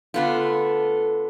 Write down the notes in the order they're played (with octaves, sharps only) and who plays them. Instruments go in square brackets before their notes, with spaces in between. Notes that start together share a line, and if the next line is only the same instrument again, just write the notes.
[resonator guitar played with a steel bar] D3 B3 F4 [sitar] A3